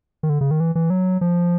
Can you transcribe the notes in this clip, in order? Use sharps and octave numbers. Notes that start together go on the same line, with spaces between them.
D#3
D3
C#3
D#3
E3
E3
F#3
F3